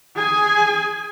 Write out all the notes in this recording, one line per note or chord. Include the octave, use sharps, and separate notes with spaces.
G#4 G#5